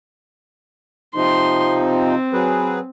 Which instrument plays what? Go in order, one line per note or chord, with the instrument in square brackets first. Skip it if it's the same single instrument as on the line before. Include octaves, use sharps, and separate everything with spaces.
[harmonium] C3 F3 D#4 [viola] C6
[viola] C4
[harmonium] F#3 G#4 B4